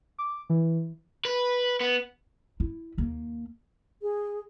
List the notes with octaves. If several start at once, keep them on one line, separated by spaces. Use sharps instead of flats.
D6
E3
B4
B3
E4
D#2 A#3
G#4